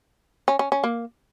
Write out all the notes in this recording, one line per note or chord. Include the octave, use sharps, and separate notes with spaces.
C#4
C#4
C#4
A#3